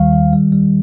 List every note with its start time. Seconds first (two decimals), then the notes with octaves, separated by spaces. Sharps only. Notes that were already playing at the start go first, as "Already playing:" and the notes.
Already playing: D#2 D#3 G3 F5
0.13 D#3
0.33 G3
0.52 G3